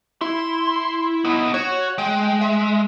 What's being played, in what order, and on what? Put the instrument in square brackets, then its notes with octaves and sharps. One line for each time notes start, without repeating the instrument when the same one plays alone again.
[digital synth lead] E4 [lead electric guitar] C6
[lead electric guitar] B3 D#4
[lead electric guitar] F#4 [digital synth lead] C#5
[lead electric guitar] G#3 [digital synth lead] G5
[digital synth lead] E5